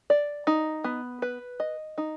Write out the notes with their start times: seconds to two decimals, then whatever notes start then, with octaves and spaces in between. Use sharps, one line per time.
0.10 D5
0.47 D#4
0.84 B3
1.22 B4
1.60 D#5
1.98 D#4